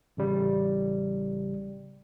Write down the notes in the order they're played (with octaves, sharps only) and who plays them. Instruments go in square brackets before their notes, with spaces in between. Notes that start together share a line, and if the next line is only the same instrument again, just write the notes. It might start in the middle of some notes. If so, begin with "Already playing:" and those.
[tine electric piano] A1 C#3 G3